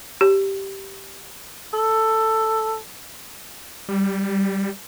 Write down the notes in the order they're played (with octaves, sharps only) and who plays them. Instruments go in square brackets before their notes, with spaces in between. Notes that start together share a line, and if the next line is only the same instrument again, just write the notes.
[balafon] G4
[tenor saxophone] A4
[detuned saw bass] G3